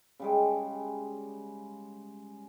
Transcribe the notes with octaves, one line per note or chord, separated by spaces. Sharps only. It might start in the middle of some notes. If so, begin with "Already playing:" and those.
C#3 G3 G#3